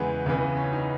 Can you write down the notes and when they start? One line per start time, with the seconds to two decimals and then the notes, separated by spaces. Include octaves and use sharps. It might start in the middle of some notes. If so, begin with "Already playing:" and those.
Already playing: E2 C#3 E3 G#3 B3
0.26 C#2 C#3 E3
0.57 C#4
0.73 D#4